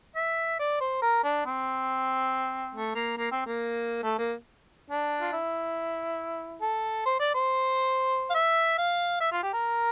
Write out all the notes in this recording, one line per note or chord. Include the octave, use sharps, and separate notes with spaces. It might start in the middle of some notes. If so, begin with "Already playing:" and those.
E5
D5
C5
A#4
D4
C4
A3
A#3
A#3
C4
A#3
A3
A#3
D4
F4
E4
A4
C5
D5
C5
F5
E5
F5
E5
F4
G4
A#4